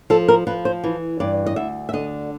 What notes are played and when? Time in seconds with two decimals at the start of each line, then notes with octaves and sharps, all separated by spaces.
0.10 F3 A4
0.28 A#4
0.47 F3 B4
0.65 C5
0.84 E3
1.20 G2 D5
1.46 D#5
1.56 D2 E5
1.89 E5
1.93 D3 D#5